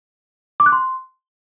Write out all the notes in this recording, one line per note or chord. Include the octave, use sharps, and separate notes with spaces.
D6
F#6
C6